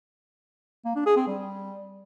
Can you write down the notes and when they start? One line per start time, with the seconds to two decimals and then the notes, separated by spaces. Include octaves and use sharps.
0.85 A#3
0.96 D4
1.06 G#4
1.17 C4
1.27 G3